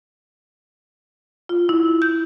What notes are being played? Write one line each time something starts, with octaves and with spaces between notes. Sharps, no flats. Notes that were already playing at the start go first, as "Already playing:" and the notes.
F4
E4
G6